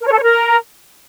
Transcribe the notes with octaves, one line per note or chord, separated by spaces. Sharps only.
A#4
C#5
A4
C#5
A#4